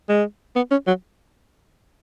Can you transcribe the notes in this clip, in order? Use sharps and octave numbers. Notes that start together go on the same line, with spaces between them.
G#3
B3
C#4
F#3